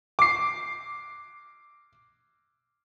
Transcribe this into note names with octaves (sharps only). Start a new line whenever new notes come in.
D6 C7